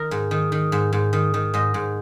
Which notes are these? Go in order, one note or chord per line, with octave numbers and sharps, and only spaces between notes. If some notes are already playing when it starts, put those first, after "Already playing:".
Already playing: D#3 A#4
G#2
D#3
D#3
G#2
G#2
D#3
D#3
G#2 D#5
G#2